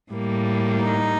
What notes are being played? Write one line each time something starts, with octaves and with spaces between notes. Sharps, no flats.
A2 G3 A#3
D#4